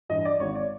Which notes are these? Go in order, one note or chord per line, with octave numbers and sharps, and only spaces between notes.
G2 E3 D#5
D5
G#1 C#5
D5